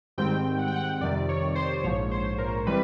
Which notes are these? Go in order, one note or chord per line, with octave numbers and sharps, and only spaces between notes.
G#2 D#3 G3 C4 G5
F#5
G5
F#5
F2 C3 D#3 G3 D5
C#5
C5
A#1 G#2 F3 C#5
C5
A#4
E3 G3 C4 B4